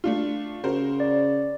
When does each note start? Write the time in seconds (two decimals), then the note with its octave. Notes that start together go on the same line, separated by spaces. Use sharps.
0.04 A3 D4 F4
0.64 C#3 F#4 A#4 C5
1.00 D5